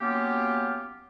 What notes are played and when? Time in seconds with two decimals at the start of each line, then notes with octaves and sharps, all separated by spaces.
0.01 F#3 A#3 B3 C#4 F4 G4